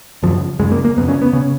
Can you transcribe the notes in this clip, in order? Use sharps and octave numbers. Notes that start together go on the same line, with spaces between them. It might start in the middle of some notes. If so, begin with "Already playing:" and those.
F#2 C#3 F3
F#2 C#3 G#3
A#3
A#3
F2 C#3 B3
C#4
B3
C#3 C#4